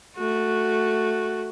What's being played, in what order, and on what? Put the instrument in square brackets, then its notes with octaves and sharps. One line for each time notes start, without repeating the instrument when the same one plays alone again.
[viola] A3 F#4